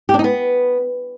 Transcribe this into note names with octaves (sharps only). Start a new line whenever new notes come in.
G4
D4
D#4
B3